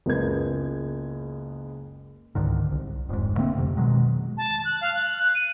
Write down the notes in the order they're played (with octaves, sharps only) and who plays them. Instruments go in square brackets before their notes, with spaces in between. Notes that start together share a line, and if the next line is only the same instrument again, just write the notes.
[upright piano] F#1 C#2 B3 A#4 G#6
[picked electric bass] C#2 G#2 D3 D#3
C2
D#1 F2 G#2
D3 A3 A#3 C4
F2 C3
B2 D#3 F#3 G#3
[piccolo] A5
F#6
F5
F#6
D#7